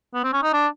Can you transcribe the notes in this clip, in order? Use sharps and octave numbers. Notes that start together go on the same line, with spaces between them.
B3
C4
C#4
D#4
D4